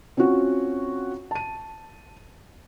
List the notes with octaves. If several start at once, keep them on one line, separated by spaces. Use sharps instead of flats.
C4 C#4 F4 F#4
A5 D#7